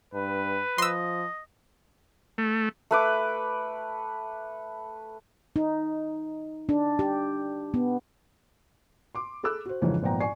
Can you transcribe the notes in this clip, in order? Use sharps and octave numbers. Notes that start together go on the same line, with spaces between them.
G2 B4
F3 D#5 C6 E6
A3
A3 B4 D6
D#4
D4
G4
B3
C6 D6
G#4 A4 B5 D6 E6 F#6
F#4 C5
F2 G#2 C#3 E3 C#4 D#4
G#1 F2 A#2 B3 G5 A#5
D5 G#5 C#6 C7